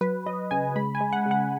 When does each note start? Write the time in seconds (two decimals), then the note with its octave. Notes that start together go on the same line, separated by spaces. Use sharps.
0.01 F#3 B4
0.26 F#3 D#5
0.51 C#3 G#5
0.76 G#3 B5
0.95 G#5
1.00 G#3
1.13 F#5
1.26 C#3
1.31 F#5